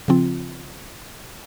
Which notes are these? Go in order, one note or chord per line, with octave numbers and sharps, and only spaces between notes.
C#3 F3 C4 F4